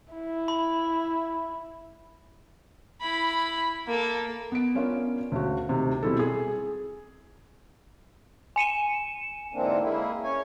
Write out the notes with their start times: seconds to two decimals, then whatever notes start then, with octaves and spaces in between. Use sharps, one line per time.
0.14 E4
0.48 B5
3.01 E4 B5
3.88 A#3 A4
4.52 B3 D7
4.75 B3 C#4 D4 F4 A#4
5.32 D2 C#3 F#4
5.69 D2 C3 D#3
6.03 B2 G3 C4 E4 G#4 A4
6.19 G#4
8.56 G#5 C#7 D#7 E7
9.54 G#2 D3 E3 A#3 C4 D4
9.80 G#3 A#3 E4
10.23 C#4 C#5 G#5